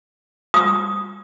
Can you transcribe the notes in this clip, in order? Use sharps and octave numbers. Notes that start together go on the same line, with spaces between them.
D#6